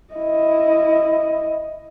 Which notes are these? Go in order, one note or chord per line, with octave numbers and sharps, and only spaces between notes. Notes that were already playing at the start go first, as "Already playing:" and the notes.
E4 D#5